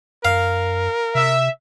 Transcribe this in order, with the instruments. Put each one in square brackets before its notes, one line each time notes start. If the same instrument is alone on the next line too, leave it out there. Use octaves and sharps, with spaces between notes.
[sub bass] F#2 [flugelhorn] A#4 [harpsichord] F5
[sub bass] C3 [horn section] E5